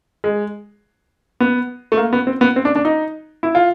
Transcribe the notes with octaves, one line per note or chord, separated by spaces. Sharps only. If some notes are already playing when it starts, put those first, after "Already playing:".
G#3
B3
A3
A#3
B3
C4
B3
C4
D4
D4
D#4
E4
F4